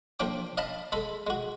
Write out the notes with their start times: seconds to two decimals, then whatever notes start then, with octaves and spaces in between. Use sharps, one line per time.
0.20 F3 A#3 D4 G5 D6
0.57 D#5 F5 A5 B5
0.92 G#3 A4 B5
1.27 G#3 F#4